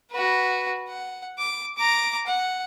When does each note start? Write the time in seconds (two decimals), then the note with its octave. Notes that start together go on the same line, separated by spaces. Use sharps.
0.12 F#4 B4
0.89 F#5
1.39 D6
1.77 A#5 D6
2.27 F#5